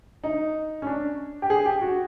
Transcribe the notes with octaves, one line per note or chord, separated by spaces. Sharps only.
D#4
C#4
D4
G4
G#4
G4
F#4